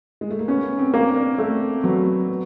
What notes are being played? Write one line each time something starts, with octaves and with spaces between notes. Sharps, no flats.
G#3
A3
A#3
B3 C#4
C4
A#3
D4
A3 C4
F#3 B3
B3